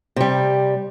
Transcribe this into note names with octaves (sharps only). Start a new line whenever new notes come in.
C3 G3